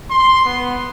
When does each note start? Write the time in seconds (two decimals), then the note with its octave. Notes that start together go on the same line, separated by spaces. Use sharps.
0.11 C6
0.46 B3